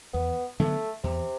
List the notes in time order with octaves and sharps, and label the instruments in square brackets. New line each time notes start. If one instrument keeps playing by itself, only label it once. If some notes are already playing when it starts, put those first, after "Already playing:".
[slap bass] E2 [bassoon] B3
[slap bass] D3 F#3 B3 [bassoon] A3
[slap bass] E2 [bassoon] C3